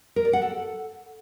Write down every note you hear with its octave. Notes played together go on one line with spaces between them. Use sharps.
A#4
D5
F#5
A4